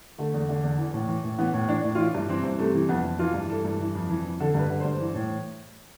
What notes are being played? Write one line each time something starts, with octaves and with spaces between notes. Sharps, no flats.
D3 A3
E2
D3
E2
E3
A2
E3
A2
E3 B3
A2
E3 D4
A2
F4
E3 E4
G2
E3 C4
G2
C3 A3
E3
F2 B3
F2
E3 F4
G2
E3 A4
G2
E3
F2
E3
F2
D3 A4
G2 B4
D3
G2 C5
E3
A2